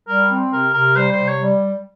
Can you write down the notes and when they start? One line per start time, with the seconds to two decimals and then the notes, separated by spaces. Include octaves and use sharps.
0.08 G3 A#4
0.30 C4
0.52 C3 A#4
0.73 C3 A#4
0.96 G3 C5
1.12 C5
1.18 C3
1.28 C#5
1.39 G3